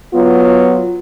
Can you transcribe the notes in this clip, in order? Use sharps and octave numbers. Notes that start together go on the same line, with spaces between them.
F#3 B3 F4